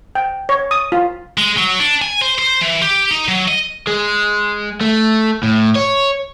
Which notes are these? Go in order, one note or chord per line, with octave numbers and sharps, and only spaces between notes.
G5
C#5
D#6
F4
G#3
F#3
D4
G#5
C5
C5
E3
G4
D#4
F#3
D#5
G#3
A3
A2
C#5